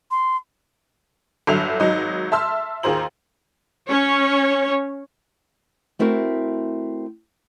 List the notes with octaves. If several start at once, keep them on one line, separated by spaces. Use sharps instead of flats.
C6
G1 D3 F#3 E5 F7
G#1 F#3 D#4 D#5
E5 A5 C6 E6 F6
D#2 F4 G#4 C5 A#5 F#7
C#4 C#5
A3 C4 E4 F#4 A#4